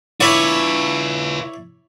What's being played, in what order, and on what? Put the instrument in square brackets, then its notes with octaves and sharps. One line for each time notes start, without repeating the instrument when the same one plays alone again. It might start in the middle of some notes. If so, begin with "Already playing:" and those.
[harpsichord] E4 C#5 D5 [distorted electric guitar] F4 B4